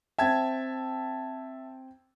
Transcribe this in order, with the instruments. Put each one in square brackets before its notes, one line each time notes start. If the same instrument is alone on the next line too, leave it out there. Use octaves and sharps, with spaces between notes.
[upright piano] C4 G5 [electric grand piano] E5 A5 G#6